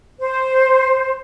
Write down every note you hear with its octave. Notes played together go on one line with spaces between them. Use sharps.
C5